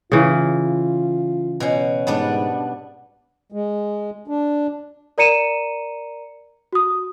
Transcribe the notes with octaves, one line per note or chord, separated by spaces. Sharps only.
C#3 E3 F4
B2 C#4
G#2 G3 B3 D4
G#3
D4
A#4 D5 A#5 C#7 D#7 E7
F#4 D#6